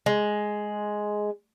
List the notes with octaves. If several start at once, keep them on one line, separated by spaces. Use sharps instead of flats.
G#3